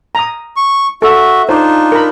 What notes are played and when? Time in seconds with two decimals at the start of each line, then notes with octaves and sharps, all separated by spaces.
0.15 A#5 D#6
0.56 C#6
1.02 F#4 A4 E5
1.49 D4 D#4 F4 C5
1.92 A#4 B5